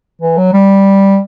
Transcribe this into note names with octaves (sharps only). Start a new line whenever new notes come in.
E3
F#3
G3